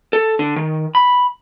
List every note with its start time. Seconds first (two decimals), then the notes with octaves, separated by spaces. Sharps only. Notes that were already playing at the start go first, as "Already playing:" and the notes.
0.13 A4
0.39 D3
0.56 D#3
0.95 B5